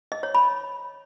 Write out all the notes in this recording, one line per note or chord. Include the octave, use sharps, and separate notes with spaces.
D#5
C#5
B5